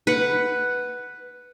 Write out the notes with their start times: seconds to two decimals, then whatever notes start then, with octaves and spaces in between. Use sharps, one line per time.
0.07 B4 F#5